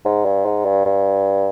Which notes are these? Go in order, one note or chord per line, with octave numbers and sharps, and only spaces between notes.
G#2
G2
G#2
G2
G2